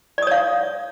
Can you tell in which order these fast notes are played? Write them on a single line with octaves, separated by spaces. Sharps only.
D5 D#6 C#5 F5